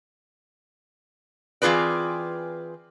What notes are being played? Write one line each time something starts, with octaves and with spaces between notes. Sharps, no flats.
E3 C4 F4 G#4 B4 D5